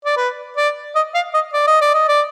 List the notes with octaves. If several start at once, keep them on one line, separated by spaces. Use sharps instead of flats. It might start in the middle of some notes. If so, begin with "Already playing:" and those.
D5
B4
D5
D#5
F5
D#5
D5
D#5
D5
D#5
D5